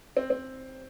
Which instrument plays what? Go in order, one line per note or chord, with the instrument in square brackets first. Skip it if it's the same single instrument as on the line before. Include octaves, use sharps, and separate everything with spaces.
[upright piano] C4
C4